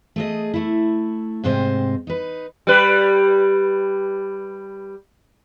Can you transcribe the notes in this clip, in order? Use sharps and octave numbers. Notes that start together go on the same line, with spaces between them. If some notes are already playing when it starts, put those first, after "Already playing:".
A3 G#4 D#5
A3 E4
G#2 C3 C4 C5 D#5
D#4 B4
G3 B4